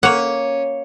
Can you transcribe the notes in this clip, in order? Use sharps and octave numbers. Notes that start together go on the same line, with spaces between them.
A#3 C#4 C#5 F#5